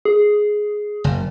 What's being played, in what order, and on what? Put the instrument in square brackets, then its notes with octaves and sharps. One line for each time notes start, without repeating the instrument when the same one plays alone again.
[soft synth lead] G#4
[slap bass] F#1